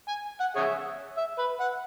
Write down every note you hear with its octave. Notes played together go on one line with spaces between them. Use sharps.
G#5
F#5
G#4 C#5 E5
E5
B4
F#5